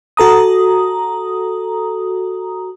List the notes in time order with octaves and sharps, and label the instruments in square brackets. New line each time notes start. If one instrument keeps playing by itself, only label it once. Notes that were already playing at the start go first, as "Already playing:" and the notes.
[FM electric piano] F#4 A4 A#5 D#6